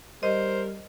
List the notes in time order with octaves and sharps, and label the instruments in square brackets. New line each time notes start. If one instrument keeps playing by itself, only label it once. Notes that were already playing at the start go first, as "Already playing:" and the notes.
[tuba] G3 [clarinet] A#4 [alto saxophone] C5 [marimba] D#5